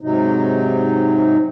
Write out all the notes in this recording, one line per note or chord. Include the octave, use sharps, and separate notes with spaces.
G#2 C3 F#3 D#4